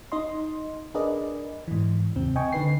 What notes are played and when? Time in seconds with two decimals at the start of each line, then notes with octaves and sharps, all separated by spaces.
0.12 D#4 D#5 C6
0.94 D4 G#4 A#4 B4 D5 D#5
1.68 G#2 E3
2.16 D#2 C3 C4
2.36 D#5 G5 G#5 C#6
2.53 D3 D#4 B4 C7